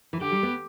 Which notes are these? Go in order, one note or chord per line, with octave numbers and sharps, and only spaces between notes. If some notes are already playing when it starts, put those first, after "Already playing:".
E3
D3 G4
G3
B3